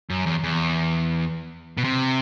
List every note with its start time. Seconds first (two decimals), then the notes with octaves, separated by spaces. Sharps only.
0.10 F#2
0.26 E2
0.44 E2
1.77 B2
1.84 C3